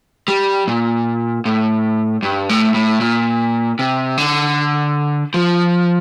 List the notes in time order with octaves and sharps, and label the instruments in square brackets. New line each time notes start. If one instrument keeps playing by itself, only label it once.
[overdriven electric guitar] G3
A#2
A2
G2
A2
A2
A#2
C3
D3
F3